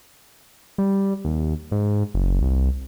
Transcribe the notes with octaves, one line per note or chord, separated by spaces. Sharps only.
G3
D#2
G#2
F#1
C2